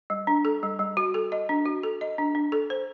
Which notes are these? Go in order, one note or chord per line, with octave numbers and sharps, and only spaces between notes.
G3
D4
A4
G3
G3
F#4
A4
D#5
D4
F#4
A4
D#5
D4
D4
A4
C5